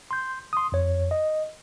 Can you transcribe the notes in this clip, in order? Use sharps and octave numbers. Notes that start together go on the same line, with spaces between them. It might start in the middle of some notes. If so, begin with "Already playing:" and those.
C6 G6
C6 D#6
F2 C#5
D#5